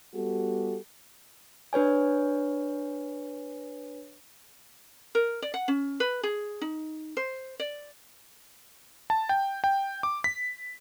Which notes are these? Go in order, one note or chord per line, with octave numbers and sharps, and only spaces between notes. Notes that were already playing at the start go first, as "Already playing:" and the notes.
G3 B3 F#4 G4 A4
D4 B4 C#5 G#5
A#4
D5
F#5
C#4
B4
G#4
D#4
C5
D5
A5
G5
G5
D6
B6